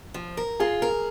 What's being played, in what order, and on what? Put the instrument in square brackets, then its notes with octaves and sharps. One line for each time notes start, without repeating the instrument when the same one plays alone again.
[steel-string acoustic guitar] F3
A#4
[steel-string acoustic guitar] F4 [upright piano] G#4
[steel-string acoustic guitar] A#4